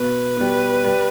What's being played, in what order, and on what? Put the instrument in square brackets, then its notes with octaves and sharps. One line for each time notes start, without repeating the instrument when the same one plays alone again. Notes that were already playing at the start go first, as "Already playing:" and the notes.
Already playing: [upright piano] B2 [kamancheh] B4
[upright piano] G3 B3
G3